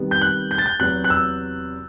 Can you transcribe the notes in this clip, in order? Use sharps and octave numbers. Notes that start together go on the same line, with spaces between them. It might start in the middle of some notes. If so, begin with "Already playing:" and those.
Already playing: C3 D#3 G3 B3
G6
F#6
G6
A6
G6
E2 C3 F#3 B3 F#6
F#6
E6